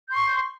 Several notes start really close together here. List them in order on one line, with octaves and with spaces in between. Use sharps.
G6 C6 C#6